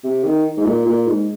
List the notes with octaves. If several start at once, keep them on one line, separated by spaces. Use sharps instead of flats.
C3
D#3
G#2
A#2
A#2
G#2